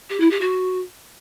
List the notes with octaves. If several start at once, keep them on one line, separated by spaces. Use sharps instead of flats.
G4
E4
G4
F#4